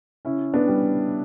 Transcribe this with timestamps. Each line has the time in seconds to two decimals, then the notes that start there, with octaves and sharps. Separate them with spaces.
0.25 C#3 C#4 E4
0.54 B3 D4
0.67 G3